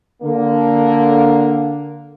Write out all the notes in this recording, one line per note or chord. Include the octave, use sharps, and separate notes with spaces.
D3 A#3